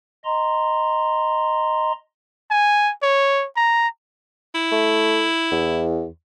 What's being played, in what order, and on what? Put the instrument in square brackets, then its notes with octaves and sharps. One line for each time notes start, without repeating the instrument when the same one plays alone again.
[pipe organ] D#5 A#5 C6
[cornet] G#5
C#5
A#5
[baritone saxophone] E4
[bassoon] A3
E2